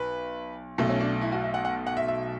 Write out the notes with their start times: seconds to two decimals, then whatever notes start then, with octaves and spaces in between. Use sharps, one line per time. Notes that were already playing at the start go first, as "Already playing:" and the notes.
Already playing: B1 B4
0.78 B1 B2 A3
0.89 C#4
1.00 D4
1.21 E4
1.32 F#4
1.44 E5
1.54 F#5
1.65 F#5
1.87 F#5
1.97 E5
2.08 E5